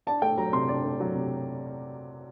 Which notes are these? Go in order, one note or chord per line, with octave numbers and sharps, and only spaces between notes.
D4 A5
A3 G5
F#3 A#5
C3 C6
D4 D5
A3
F#3
C3